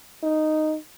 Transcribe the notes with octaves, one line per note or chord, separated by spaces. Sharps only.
D#4